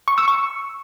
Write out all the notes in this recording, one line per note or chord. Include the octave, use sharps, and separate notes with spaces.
C#6
E6
C#6